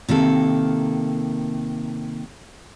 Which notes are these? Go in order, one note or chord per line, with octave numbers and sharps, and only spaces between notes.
C3 D#3 A#3 A4